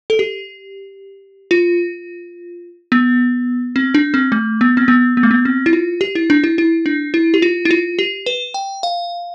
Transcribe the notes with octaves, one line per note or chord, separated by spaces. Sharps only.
A4
G4
F4
B3
C4
D4
C4
A3
B3
C4
B3
B3
A3
B3
C4
E4
F4
G4
E4
D4
E4
E4
D4
E4
G4
F4
E4
F4
G4
B4
G5
F5